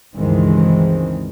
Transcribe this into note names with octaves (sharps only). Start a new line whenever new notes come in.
C#2 G2 D#3 E3 G#3 C4